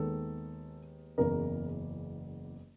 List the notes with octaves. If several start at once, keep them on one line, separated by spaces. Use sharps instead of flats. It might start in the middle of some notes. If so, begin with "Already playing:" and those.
Already playing: D#2 D#3 G#3 B3 A4
F#1 E2 C#3 E3 A#4